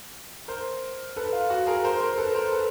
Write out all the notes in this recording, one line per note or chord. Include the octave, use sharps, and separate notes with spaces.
A#4 C5
A4 B4
F4
F#4
G#4 A#4
A#4 C5
A#4 C5
A4 B4
A#4 C5
A4 B4